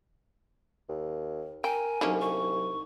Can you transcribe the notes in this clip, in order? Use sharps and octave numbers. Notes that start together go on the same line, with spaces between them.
D#2
A#4 G5 G#5
C2 D3 F#3 A#3 C#4 D#4
C#6